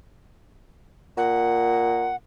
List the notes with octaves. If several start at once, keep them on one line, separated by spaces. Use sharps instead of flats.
A#2 F#5